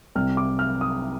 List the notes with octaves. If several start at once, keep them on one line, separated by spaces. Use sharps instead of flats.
C2 C3 G3 F6
D6
F6
D#6